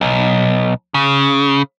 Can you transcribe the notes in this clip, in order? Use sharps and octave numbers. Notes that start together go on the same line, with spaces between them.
B1
C#3